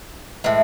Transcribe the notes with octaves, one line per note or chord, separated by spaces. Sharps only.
A2 E3 G#3